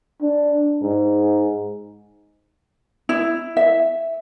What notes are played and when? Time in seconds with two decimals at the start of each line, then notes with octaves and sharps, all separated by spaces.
0.22 D4
0.82 G#2
3.09 E4
3.57 E5